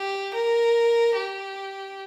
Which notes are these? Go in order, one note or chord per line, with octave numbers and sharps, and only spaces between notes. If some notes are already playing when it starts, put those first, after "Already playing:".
Already playing: G4
A#4
G4